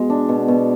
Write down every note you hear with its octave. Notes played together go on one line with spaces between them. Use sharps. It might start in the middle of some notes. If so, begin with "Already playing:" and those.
Already playing: B2 G#3
D4
B2
B2